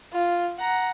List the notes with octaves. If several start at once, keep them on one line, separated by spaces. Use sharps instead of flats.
F4
F#5 A#5